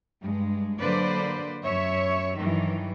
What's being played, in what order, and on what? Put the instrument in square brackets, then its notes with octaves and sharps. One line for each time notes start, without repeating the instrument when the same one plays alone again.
[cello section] G2 G#3
D3 F#3 A#3 B4 C5 D5
F#2 C#5 E5
G2 D#3 E3 F#3